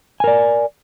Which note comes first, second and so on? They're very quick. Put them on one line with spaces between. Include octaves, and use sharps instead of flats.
G#5 A#4 D5